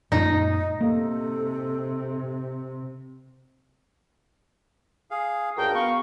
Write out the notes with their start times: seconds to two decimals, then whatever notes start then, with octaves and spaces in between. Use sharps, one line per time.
0.12 F#2 A#2 G#3 D#4
0.81 C3 A#3 A4
5.11 G#4 F5
5.57 C#2 G2 F#4 G#4 A#4 F5 G5 A5
5.74 B3 F5 C#6